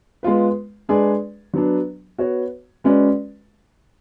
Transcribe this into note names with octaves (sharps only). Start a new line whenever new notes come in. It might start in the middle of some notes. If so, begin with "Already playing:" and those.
G#3 B3 F4 B4
G#3 D4 G#4 B4 D5
F#3 B3 D4
B3 F#4 C#5
G#3 C#4 F#4 B4 D5